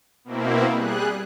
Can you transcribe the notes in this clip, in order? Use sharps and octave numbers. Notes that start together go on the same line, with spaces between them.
B2 A#3 C4 E4
G3 G#4 F#6